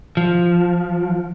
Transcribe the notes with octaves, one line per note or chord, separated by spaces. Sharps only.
F3